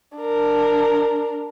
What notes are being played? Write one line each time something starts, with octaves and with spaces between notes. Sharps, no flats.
D4 A#4